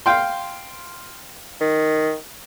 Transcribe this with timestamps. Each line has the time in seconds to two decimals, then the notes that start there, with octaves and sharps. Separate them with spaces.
0.06 F5 G5 C6
1.61 D#3